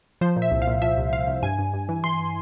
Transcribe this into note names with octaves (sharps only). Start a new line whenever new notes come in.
F3 C5
A#2
E5
C2
F5
A#2
F3 E5
C2
C2 F5
C2
G2 G#5
G2
G2
E3
E3 C6